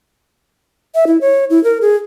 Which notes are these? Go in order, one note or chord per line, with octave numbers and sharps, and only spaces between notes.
E5
E4
C#5
E4
A#4
G#4